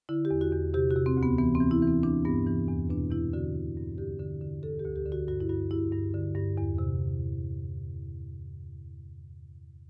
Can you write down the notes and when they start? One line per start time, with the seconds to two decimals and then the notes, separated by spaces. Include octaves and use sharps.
0.09 D3 E4
0.25 G4
0.31 E2
0.41 F#4
0.53 E2
0.74 C3 G4
0.91 F#4
0.96 C3
1.06 C4
1.17 D2
1.23 B3
1.38 E3 B3
1.55 C4
1.60 E3
1.71 E4
1.82 E3
1.87 C4
2.03 E3 D4
2.25 G2 B3
2.47 E3
2.68 E2
2.89 B2 D4
3.11 E2 E4
3.33 D3 F#4
3.55 D3
3.77 G2
3.98 D3 G4
4.20 D3
4.41 D3
4.63 D3 A4
4.79 D2 G4
4.96 G4
5.06 D3
5.12 F#4
5.28 G2 F#4
5.40 E4
5.49 G2 F#4
5.70 G2 E4
5.93 G2
6.14 D3
6.35 G2
6.58 E2
6.78 C3